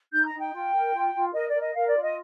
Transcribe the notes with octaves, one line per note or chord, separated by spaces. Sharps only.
D#4 G6
A#5
D#4
G5
F4
A#4
F4
F4
A#4 D#5
D5
A#4
D#5
A#4 F5
D5
F4
D#5